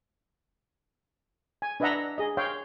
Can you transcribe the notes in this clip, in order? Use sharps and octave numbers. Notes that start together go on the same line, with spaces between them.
G#5
D4 B4 D#5 E5 F#5 A#5
G#4 D#5
C#5 F5 G5 C6